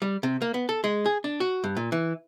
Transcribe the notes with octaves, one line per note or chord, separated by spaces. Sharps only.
G3
C3
A#3
B3
A4
G#3
G#4
D4
F#4
G2
A#2
E3